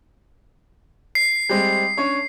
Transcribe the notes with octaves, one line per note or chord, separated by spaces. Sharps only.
C7
G3 G#3 C4
C#4 D4 C#5